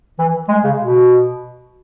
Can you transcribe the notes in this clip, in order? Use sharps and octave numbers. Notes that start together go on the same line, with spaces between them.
E3
G#3
C#3
B2